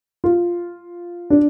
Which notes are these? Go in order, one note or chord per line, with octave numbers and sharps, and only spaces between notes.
F4
D4